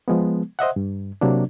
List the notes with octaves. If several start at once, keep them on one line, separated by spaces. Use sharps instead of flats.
F3 G#3 B3
C5 D#5 E5 F#5
G2
C3 F#3 A#3 D4